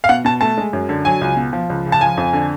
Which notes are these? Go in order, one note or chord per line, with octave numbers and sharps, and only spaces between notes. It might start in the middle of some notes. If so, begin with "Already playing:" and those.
F5
B2 F#5
B2 A5
A3 A5
G#3
F#2
D3
F#3 G#5
C#2
B2
F3
C#2
C#3
A5
F3 G#5
F2
D3